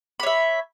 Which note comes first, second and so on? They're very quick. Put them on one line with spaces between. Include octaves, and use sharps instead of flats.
B5 C#5 E5